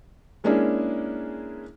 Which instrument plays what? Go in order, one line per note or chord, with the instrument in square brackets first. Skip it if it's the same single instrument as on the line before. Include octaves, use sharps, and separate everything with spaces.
[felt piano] G#3 A#3 C#4 D4 E4 G#4